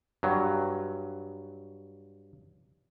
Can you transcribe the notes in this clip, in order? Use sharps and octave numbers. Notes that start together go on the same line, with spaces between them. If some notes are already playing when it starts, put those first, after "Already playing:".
G2 F#3